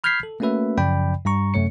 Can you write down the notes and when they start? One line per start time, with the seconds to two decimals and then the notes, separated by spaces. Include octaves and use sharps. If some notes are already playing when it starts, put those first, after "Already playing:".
0.04 B5 F6 G6 G#6 B6 C7
0.23 A4
0.40 A3 A#3 C#4 F#4 B4 E5
0.78 F#2 C#3 F3 D5 G5 B5
1.25 G2 G3 A#5 C#6
1.54 F#2 C3 A3 C#5 C#7